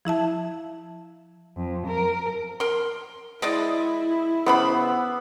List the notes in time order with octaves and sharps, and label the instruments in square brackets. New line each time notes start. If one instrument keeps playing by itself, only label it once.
[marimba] F3 E4 E5 A5
[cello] F2
A#4
[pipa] A#4 C6
[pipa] G#3 D5 D#5 [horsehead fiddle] E4
[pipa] C#3 C5 B5 [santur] B3 D6 E6